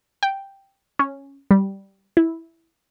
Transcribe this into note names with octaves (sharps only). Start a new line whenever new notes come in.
G5
C#4
G3
E4